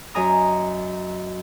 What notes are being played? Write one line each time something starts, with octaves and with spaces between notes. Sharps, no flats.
F#2 D#5 G#5 A#5 D#6